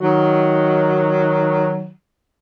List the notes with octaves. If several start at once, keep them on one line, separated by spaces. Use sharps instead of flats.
D#3 F#3